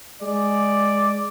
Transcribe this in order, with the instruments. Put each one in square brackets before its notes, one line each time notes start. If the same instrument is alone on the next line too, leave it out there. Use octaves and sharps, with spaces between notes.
[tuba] G#3 [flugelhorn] D5